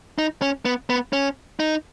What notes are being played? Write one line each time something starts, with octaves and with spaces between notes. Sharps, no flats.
D#4
C#4
B3
B3
C#4
D#4